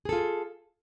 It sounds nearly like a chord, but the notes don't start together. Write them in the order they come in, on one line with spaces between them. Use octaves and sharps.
G#4 A4 F4